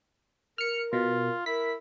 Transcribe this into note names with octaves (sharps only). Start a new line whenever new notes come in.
A#4 F6 C#7
B2 F4
E4 A#4 B6